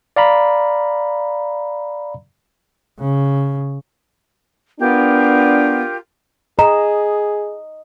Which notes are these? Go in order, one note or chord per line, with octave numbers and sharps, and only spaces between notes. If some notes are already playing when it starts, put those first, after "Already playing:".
D5 F5 A#5 B5
C#3
B3 D4 F4 G4 A#4
G#4 D#5 A#5